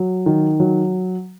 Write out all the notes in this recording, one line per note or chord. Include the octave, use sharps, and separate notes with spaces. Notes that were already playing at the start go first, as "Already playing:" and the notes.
Already playing: F#3
D#3
F#3